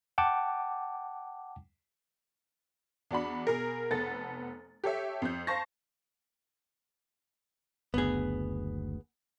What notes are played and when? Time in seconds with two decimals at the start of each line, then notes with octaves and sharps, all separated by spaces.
0.18 F#5 G5 A5 D6
3.11 E2 D4 F#4 B5
3.47 B2 G#4 A#4
3.91 F1 B3 A4 A6
4.84 G4 A4 C#5 E5
5.22 F2 G6
5.47 C5 F5 A5 C#6 A#6
7.94 F#1 D2 B3 G#4